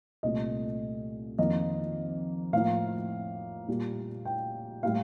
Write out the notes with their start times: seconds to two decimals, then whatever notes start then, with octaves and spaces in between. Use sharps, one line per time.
0.23 C2 A#2 A3 D#5
1.38 F2 D#3 A#3 D#5
2.53 A2 F3 A#3 F5
3.68 A#2 G3 A#3
4.25 G5
4.83 A2 G3 A#3 F5